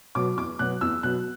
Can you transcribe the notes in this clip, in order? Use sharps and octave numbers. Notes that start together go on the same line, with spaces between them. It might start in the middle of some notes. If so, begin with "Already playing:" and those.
B2 F#3 B3 D6
E2 D6
B2 F#3 B3 F#6
E2 E6
B2 F#3 B3 F#6